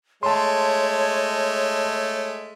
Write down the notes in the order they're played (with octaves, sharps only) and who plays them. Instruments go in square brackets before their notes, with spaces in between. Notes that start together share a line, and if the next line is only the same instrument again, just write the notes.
[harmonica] G#3 A3 [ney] C#5 [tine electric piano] A5 C6